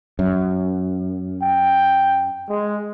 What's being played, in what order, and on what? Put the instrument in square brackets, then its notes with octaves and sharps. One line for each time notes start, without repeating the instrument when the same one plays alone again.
[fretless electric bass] F#2
[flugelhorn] G5
G#3